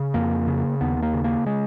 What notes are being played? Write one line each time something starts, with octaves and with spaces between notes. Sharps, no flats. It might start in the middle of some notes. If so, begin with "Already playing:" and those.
Already playing: C#3
F2 A#3
C#3
D#2 B3
A#3
C#3
A#3
G#3